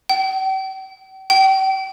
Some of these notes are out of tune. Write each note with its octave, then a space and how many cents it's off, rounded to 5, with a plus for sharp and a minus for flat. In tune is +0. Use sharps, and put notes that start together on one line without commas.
G5 -40
G5 -35